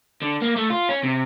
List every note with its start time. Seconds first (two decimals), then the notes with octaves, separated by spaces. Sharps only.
0.22 D3
0.42 A#3
0.56 A3
0.70 F4
0.89 C#4
1.04 C3